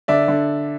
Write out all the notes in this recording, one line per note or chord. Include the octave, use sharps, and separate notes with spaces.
D3 D5 E5
D3